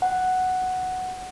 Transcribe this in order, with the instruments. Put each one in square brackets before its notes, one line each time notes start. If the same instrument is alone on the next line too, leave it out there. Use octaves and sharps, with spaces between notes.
[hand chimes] F#5